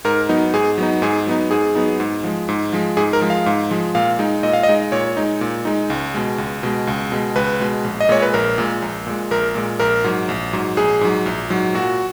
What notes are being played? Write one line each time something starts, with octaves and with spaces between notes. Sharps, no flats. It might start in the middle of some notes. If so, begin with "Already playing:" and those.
G#2 A#4
F#3 B3 D#4
G#2 G#4
F#3 B3 D#4
G#2 G#4
F#3 B3 D#4
G#2 G#4
F#3 B3 D#4
G#2
F3 G#3
G#2
F3 G#3
G#2 G#4
A#4
F3 G#3
F5
G#2
F3 G#3
A#2 F5
G#3 D#4
A#2 D#5
F5
D#5
G#3 D#4
A#2 C#5
G#3 D#4
A#2
G#3 D#4
C#2
B2 G#3
C#2
B2 G#3
C#2
B2 G#3
C#2 B4
B2 G#3
A#1
D#5
A#2 G#3 C#5
B4
A#1 A#4
A#2 G#3
A#1
A#2 G#3
A#1 A#4
A#2 G#3
A#1 A#4
G#2 F#3
A#1
G#2 F#3
A#1 G#4
G#2 F#3
A#1
G#2 F#3
A#2 F#4